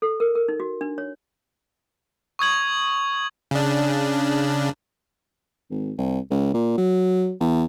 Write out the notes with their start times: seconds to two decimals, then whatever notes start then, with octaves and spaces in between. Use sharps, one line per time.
0.02 A4
0.20 A#4
0.35 A#4
0.48 D#4
0.60 F#4
0.81 D4
0.98 C#5
2.39 C#6 D#6 G#6 F#7
3.51 C#3 D4
5.71 G#1
5.98 C2
6.31 C#2
6.54 A#2
6.77 F#3
7.40 E2